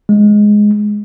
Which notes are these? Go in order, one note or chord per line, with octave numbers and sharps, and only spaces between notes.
G#3